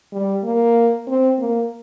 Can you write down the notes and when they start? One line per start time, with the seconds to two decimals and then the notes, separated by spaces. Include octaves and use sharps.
0.13 G3
0.44 A#3
1.08 C4
1.39 A#3